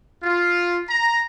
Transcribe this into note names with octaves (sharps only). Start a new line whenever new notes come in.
F4
A#5